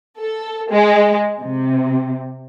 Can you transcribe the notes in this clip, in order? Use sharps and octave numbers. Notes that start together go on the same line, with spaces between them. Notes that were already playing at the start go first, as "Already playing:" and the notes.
A4
G#3
C3